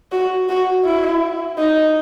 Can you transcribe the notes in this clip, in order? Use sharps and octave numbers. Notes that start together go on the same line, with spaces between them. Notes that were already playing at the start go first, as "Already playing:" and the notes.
F#4
F#4
E4
D#4